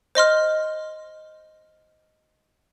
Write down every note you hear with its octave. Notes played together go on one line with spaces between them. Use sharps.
C5 D#5 C6 F6